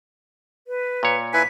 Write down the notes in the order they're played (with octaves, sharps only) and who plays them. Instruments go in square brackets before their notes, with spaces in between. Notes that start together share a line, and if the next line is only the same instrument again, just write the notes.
[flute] B4
[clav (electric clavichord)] A#2 C#5
[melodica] E4 B4 G#5 [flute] B6